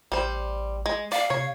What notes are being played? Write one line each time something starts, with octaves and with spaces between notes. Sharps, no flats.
A1 G3 C5
G#3
D5 F5
C3 C#5